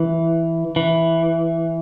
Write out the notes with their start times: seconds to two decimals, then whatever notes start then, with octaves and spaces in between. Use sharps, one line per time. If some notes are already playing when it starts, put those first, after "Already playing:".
Already playing: E3
0.76 E3